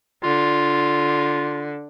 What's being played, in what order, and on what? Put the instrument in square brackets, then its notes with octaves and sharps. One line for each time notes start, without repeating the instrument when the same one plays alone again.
[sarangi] D3 [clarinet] F4